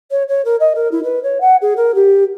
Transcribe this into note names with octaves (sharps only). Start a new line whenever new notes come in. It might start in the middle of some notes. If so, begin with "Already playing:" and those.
C#5
C#5
A#4
D#5
A#4
E4
B4
C#5
F#5
G#4
A#4
G4